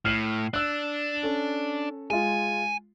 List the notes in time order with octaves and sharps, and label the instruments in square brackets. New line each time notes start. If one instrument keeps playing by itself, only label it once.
[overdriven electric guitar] A2 [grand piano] F6 C7 F#7
[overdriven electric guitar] D4 [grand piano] E6 F#6
[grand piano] C#4 A4
[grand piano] G#3 F4 [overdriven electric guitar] G#5